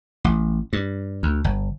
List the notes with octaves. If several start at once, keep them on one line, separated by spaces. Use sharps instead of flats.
A1
G2
D2
G1